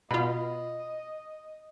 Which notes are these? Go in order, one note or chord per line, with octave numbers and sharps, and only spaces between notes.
B2 F4 D#5 B5